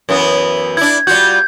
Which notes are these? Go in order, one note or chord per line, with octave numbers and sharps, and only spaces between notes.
F#2 E3 B3
D4 E4 G#6
G3 F4 F#4 G6